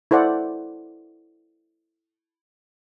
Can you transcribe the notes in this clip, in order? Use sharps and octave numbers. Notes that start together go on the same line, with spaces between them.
E4 A4 C5 D5 F#5